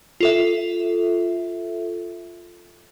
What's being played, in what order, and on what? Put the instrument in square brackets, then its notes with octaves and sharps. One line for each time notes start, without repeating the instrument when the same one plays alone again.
[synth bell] F4 A4 E5